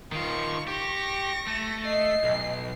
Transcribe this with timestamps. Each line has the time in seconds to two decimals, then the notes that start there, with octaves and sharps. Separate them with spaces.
0.12 D#3 F4 C#6
0.68 G4 C#6 A#6
1.47 A3
1.85 D#5 C7
2.24 B1